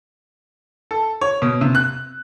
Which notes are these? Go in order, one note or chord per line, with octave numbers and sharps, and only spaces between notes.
A4
C#5
B2
C3
F#6